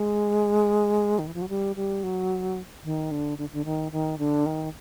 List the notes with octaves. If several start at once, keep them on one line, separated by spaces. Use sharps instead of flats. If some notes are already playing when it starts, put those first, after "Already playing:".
Already playing: G#3
D#3
E3
F3
F#3
G3
G3
F#3
D#3
D3
D3
D3
D#3
D#3
D3
D#3